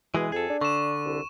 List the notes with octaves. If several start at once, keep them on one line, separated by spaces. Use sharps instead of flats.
B2 E3 G#3 G#4
F2 G#4 A4
D4
D3 C#6 E7
C2